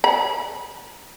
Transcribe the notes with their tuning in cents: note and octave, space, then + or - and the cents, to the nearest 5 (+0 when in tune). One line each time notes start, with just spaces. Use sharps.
B5 -35